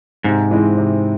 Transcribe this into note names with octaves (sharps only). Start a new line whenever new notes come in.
G#2 C3
E3 G#3 C4
C3